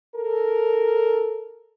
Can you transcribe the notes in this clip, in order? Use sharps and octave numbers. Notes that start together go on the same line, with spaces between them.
A4 A#4